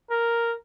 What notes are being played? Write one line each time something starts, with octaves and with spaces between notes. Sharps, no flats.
A#4